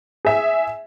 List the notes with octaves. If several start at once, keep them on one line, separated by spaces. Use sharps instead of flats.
G#4 E5